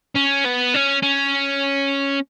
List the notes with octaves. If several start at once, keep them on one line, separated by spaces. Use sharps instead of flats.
C#4
B3
C#4
C#4